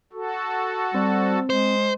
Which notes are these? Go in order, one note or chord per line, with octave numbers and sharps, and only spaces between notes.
F#4 A4
G3 C4
G#3 C5